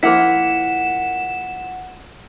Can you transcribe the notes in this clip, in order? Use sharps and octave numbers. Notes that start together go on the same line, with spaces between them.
F3 A#3 E4 F#5 B6 E7